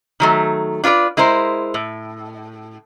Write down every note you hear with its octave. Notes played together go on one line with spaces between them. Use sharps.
D#3 F#3 A3
D4 F4 B4 C#5 D5
G#3 E4 A#4 C5
A2